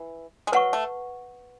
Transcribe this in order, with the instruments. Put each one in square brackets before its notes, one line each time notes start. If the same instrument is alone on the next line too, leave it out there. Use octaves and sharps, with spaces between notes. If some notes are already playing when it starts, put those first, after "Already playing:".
Already playing: [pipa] E3
G#3
[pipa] F#3 [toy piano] B4 F#5 C#6
[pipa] A3